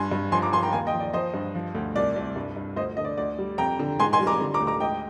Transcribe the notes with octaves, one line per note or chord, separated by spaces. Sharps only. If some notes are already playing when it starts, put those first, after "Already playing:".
Already playing: G2 G#5 C6
G2
F3 G#5 C6
A#5 D6
F3 G#5 C6
G5 A#5
D#2 F5 G#5
D#5 G5
F3
D5
F3 C5 D#5
G2
F3
D2
C2 D5
C2
G2
G2
D2 C5 D#5
D3 D#5
D5
D2 D5
G3
F2 G5 A#5
D3
G#2 G#5 C6
G#5 C6
G3
A#5 D6
D3
A#5 D6
D2
A#5 D6
G#2 D#5 G5